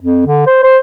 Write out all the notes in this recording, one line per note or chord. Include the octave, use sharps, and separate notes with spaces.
F2
D3
C5
C5